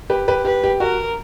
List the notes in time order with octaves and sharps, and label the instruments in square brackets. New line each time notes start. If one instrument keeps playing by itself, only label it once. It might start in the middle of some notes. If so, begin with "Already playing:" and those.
[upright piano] G4 B4
G4 B4
[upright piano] G4 [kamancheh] B4
[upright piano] G4
[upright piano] F#4 [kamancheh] A#4